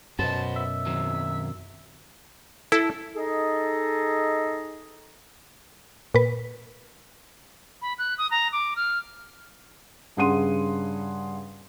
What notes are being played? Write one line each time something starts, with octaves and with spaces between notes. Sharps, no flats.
F#2 B2 F#4 B4 C5 A5
E5
D#3 F#3 C4
E4 A4
D#4 G#4 A4 D#5
A#2 B4
B5
F#6
D#6
A#5
D6
F6
G2 C#3 G#4 F#5 C6 D#7